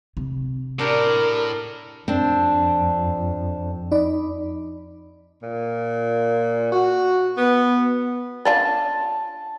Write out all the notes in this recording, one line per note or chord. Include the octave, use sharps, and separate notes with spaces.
C3
A2 D4 G4 A#4
F2 C4 D4
D#4 D5 B5
A#2
F#4
B3
C#4 D4 F4 A5